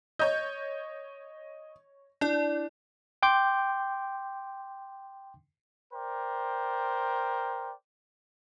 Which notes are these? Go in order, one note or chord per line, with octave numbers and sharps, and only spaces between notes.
C#5 D#5 G6
D4 E4 D5
G5 C6 D6 G6
A#4 C5 D5 G5